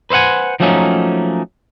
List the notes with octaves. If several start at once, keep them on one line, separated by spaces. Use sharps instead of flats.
B4 C5 E5 F#5 G#5
F3 F#3 A3 A#3 C#4 D#4